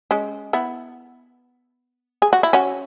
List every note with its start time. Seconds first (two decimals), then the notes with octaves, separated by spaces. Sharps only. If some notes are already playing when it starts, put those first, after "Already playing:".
0.11 G#3 C#4
0.53 B3 E4
2.22 G#4
2.33 F#4
2.43 E4
2.53 C#4 F#4